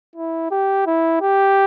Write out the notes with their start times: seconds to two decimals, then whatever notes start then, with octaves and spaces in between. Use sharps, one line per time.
0.16 E4
0.51 G4
0.86 E4
1.21 G4